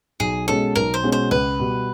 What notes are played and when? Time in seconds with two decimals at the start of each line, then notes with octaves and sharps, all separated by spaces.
0.20 B1 G#4
0.47 B2 G#3 C#4 A4
0.75 B1 A#4
0.94 C5
1.03 B2 G#3 C#4
1.12 C5
1.31 C#2 B4
1.59 B2 G3